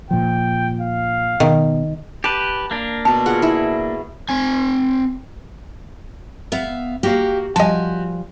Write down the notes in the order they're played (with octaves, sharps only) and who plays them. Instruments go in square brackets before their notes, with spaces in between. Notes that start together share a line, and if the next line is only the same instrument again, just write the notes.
[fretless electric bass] A#2 F3 [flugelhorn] G5
[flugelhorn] F5
[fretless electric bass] B2 [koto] D#3
[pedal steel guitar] G4 B4 [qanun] A5
[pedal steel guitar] A#3 D4
[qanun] B2 A#5 [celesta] A5
[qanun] F4 G#4 F#5
E4 G#4
[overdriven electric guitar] C4 G#5
[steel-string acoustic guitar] B3 E5 F5
[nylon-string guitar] A#3 F#4 F5 [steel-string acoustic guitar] G4
[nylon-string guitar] F3 G3 G#5 [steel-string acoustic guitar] F#4 G4 [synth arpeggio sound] D#5 A5